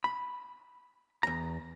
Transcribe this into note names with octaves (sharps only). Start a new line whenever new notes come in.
B5
E2 A#5